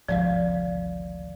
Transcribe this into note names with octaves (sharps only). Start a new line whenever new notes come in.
G#1 D2 C3 F3 D5 F5